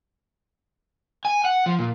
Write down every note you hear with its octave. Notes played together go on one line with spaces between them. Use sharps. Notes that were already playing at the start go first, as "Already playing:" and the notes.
G#5
F#5
F3
A#2